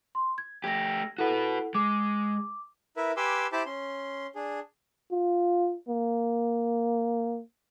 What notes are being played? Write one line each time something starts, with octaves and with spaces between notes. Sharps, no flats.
C6
G#6
A3 G4 G#6 A#6
E4 F#4 A4 B4 F#5
G#3 D6
E4 A#4 B4 E5
G4 B4 G#5 C6 D6 E6
E4 G4 C5 A5 B5 D6
C#4 C6
D4 G#4
F4
A#3